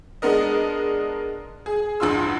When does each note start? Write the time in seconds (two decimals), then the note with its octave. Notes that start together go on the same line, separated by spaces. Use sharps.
0.22 G#3 B3 D4 A#4 D#5
1.66 G#4
2.00 A1 E2 G2 F4 C6 E6